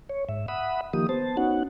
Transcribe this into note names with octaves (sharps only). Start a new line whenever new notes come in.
C#5
G#2 E5
E5 F#5 B5 D#6
D#3 F3 A#3 G4 D#6
B3 C5 A5
B3 C#4 D#4 F#4 F#5